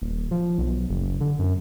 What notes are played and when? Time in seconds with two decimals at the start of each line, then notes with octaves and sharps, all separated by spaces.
0.02 D#1
0.31 F3
0.58 B1
0.90 F#1
1.21 D3
1.39 F#2